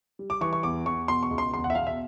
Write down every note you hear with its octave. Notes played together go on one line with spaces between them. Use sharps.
G3
D6
E3 C#6
C#6
E2 D6
E2 C#6
B2 C6
C#6
C#2
C6
E2 C6
F#5
E5
B2 F5
E5